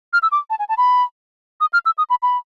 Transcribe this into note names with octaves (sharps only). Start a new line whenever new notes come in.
F6
E6
D6
A5
G#5
A5
B5
D#6
F6
E6
D#6
B5
B5